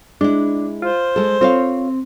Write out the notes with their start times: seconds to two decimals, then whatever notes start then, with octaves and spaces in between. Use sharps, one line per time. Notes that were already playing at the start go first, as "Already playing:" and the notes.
0.21 G#3 D4 E4
0.82 F4 C5
1.16 G#3 A4
1.41 C4 F4 C#5 F5